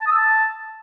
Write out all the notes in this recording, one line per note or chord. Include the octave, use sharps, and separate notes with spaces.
A5
D#6
E6
A5